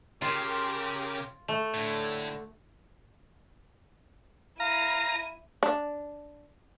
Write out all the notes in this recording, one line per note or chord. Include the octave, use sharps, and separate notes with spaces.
C#3 F4 G4 A#4
A3
A2 D3
E4 F5 A#5 D#7
D4